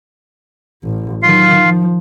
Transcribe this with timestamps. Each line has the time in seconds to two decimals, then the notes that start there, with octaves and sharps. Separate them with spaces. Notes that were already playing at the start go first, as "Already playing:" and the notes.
0.84 A1
1.23 D#3 F#3 F4 F5
1.61 F3